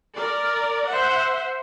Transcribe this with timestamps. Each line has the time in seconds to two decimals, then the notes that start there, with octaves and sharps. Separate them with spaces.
0.15 A#4 D5
0.88 C5 E5 F#5